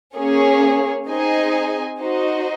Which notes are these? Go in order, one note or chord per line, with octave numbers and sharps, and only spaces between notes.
A#3 C#4 G#4 C#5
C4 D#4 G#4 D#5 G#5
D#4 F#4 C5 D#5